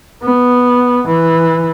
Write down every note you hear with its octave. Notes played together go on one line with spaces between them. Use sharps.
B3
E3